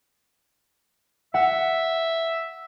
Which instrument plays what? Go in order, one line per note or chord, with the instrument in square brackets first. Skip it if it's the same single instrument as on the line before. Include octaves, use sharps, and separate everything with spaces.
[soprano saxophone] E5 [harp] F#5